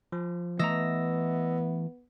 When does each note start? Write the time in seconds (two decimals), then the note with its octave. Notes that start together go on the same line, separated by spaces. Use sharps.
0.12 F3
0.59 E3 A3 B3 D#5 A#5 E6 A#6